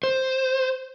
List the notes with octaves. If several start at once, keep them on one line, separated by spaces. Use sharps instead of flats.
C5